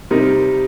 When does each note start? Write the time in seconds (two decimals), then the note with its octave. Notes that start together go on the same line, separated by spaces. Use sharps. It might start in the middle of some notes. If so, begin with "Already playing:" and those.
0.10 C3 G3 C4 D#4 A#4